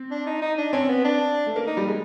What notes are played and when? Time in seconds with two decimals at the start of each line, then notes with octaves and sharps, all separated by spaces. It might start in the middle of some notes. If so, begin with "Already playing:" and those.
Already playing: C4
0.11 D4
0.27 D#4
0.42 D#4
0.58 D4
0.73 C4 C#4
0.89 B3
1.04 D4
1.46 A3
1.56 A#3
1.67 D#4
1.77 G3
1.88 G#3